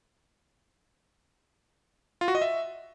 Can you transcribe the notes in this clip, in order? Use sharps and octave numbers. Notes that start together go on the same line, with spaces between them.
F4
F#4
D#5
E5